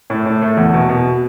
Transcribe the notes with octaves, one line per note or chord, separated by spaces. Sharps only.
A2
A2
A3
E2
B2
B2